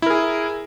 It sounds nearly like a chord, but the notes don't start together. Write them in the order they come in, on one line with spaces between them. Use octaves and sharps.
E4 A#4 G#4